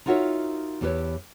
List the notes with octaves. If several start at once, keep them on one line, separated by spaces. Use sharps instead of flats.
D#4 F4 F#4 A#4 C#5 E5
E2 E4 G4 A4 B4 C#5